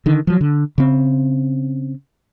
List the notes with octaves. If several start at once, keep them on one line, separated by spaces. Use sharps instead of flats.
D3 D#3
F3 F#3
D3
C#3 C4